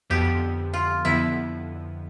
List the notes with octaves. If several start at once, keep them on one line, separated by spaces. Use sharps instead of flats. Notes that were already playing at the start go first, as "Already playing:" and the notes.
F2 D3 F3 B3 G4
F4
F2 D3 F3 B3 E4